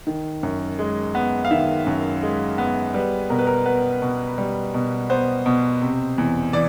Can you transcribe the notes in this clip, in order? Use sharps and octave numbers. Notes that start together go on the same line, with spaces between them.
D#3
F#2
G#3
B3
F5
D#3 E5
F#2
G#3
B3
G3 B4
B2 A#4
B4
A#4
B3 B4
B2
G3
B2
B3 C5
B2
C3
E2
E3 D5